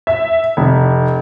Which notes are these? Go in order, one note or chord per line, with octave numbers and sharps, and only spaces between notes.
E5
F1